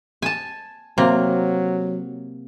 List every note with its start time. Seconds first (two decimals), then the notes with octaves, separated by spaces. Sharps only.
0.22 G#5 A5
0.98 C3 F#3 A#3